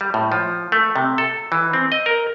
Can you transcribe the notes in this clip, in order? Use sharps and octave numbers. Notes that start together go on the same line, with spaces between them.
G3
A2
F3
A3
C3
A4
E3
C4
D#5
A#4